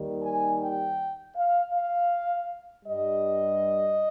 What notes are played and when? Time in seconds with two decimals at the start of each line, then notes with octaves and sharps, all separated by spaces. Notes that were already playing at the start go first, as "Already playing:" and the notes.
Already playing: D#2 D#3 G3
0.22 G#5
0.59 G5
1.35 F5
1.73 F5
2.85 G2 G3 D#5